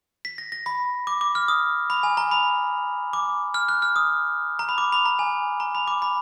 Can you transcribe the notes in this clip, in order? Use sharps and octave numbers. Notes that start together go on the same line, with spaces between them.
B6
A#6
A#6
B5
D6
D6
F6
D#6
B5
G#5
A#5
B5
D6
F6
F#6
F6
D#6
A#5
B5
D6
B5
A#5
G#5
A#5
B5
D6
B5